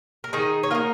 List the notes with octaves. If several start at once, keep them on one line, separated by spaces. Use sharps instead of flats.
A#4
D#3 D#4 G#4
C#5
A#3 D#4 F4 A#4